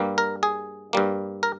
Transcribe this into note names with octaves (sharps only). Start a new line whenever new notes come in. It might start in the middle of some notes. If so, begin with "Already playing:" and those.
Already playing: G2 G3 A#3
A#4
G#4
G2 G3 A#3
A#4